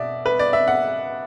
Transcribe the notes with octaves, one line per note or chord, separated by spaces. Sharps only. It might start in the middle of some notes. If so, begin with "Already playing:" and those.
Already playing: B2 D5 E5
B4
D5
E5
F#5